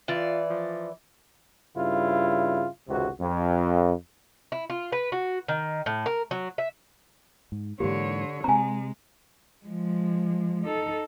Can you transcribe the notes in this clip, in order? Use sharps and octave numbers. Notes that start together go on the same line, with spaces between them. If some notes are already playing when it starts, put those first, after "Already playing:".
E3 F4 D5
F3
G2 C#3 E4 F4
G#1 C#2 C3 F#4
F2
E4
F4
B4
F#4
D#3
A2
A#4
F#3
E5
G#2
G#2 D3 E3 A#3 G4 C#5
C3 G#3 C4 G#5 A#5
F3 G#3
D#4 A4